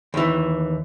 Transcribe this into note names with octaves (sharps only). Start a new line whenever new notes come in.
D#2 E3